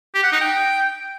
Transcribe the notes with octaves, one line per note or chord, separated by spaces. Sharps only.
G4
F#5
D#4
G5